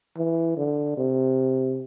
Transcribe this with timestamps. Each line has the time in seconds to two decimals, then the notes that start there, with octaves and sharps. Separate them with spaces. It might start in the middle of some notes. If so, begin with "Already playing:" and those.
0.17 E3
0.57 D3
0.98 C3